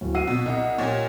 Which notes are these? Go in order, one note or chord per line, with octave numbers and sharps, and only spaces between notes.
D1
F#4 E6 C7 D#7
B2
C2 D#5 F#5
A#2 C#4 G4